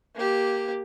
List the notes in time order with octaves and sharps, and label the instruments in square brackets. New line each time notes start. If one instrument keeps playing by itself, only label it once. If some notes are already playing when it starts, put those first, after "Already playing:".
[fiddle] A#3 G4